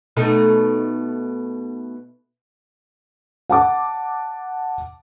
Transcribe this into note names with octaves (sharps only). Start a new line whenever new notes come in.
B2 A3 D#4
F#5 A5 D6